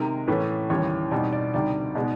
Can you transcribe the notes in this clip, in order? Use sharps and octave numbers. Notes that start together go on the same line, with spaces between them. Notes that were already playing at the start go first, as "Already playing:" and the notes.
Already playing: C3 D#3 G#3 A#4
A2 E3 A3 C#4 B4
D#2 C#3 E3 G3 C#5
B2 G3 C4 D#4 D5
D5
D2 C3 D#3 G3 D5
B2 G#3 B3 D#4 D5